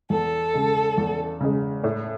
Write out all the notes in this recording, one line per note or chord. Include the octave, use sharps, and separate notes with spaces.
E2 A4
C#3 G#3
E2
C#3 G#3
A2